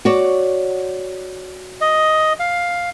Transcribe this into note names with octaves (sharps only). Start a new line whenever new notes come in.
F#4 C#5 D5
D#5
F5